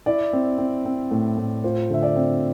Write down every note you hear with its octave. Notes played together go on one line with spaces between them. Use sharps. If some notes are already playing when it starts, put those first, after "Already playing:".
E4 D5
C4
C4
C4
A2
A2
F4 C5
D3 E5
D5
C4